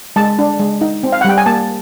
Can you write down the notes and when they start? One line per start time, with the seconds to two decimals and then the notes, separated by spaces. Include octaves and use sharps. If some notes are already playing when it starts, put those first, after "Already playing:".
0.16 G#3 A5
0.39 D4
0.59 G#3
0.81 D#4
1.03 C4
1.12 F5
1.21 F#5
1.25 G3 G5
1.38 G#5
1.46 A#3 A5